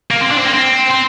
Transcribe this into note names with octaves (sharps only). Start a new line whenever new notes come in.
A#3
C4
D4
C4
A#3
C4
C4